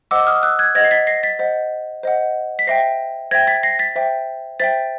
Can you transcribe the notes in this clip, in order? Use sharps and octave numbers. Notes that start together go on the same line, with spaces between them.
C5 D#5 F#5 D6 E6
D#6 F6
E6 F#6
F#6 G#6
C5 D#5 F#5 G#6 A#6
C7
A6 B6
A#6 C7
A6 B6
C5 D#5 F#5
C5 D#5 F#5
B6
C5 E5 G5 A#6 C7
C5 E5 G5 G#6 A#6
A6 B6
A#6 C7
A6 B6
C5 E5 G5
C5 E5 G5 A6 B6